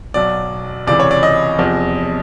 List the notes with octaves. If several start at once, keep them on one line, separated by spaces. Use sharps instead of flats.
B1 B2 F#3 D5
C#2 C3 E3 D5
C#5
D5
D#5
E2 C3 F3